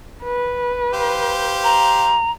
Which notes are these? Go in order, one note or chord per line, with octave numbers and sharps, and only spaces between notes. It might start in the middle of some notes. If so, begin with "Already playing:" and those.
B4
G4 C5 F5
A#5